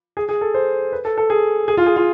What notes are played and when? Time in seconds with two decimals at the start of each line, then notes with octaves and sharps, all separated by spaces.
0.17 G#4
0.29 G#4
0.41 A4
0.54 C5
0.92 B4
1.05 A4
1.18 A4
1.30 G#4
1.68 G#4
1.77 F4
1.86 G#4
1.96 F4